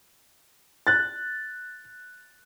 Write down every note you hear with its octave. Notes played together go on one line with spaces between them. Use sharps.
F#6 A6